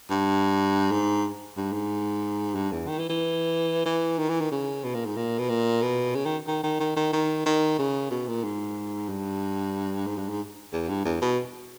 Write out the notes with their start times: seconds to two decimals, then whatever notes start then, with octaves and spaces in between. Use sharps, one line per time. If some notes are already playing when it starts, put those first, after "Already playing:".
0.10 G2
0.92 G#2
1.57 G2
1.73 G#2
2.55 G2
2.72 E2
2.88 D#3
2.99 E3
3.10 E3
3.86 E3
4.19 D#3
4.30 E3
4.41 D#3
4.52 C#3
4.84 B2
4.95 A#2
5.06 G#2
5.17 A#2
5.39 B2
5.50 A#2
5.82 B2
6.15 C#3
6.26 D#3
6.48 D#3
6.64 D#3
6.80 D#3
6.97 D#3
7.13 D#3
7.46 D#3
7.79 C#3
8.11 B2
8.28 A#2
8.44 G#2
9.09 G2
10.07 G#2
10.18 G2
10.29 G#2
10.73 E2
10.89 G2
11.05 E2
11.22 B2